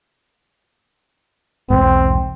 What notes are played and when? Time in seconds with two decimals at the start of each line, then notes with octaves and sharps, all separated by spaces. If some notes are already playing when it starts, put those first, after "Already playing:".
1.70 B1 E2 G#2 C4